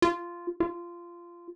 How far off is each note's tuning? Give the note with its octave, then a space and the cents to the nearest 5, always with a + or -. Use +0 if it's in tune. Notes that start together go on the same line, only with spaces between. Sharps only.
F4 -10
F4 -15